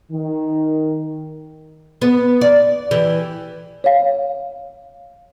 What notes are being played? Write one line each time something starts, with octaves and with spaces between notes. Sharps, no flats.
D#3
B3
D5
E3 G4
C#5 F5